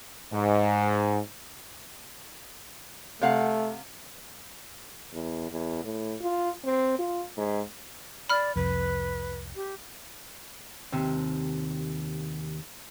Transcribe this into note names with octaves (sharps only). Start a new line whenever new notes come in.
G#2
C3 A3 F5 F#5
E2
E2
A2
F4
C4
F4
G#2
D5 B5 F6
C2 F2 B4
G4
D#2 C3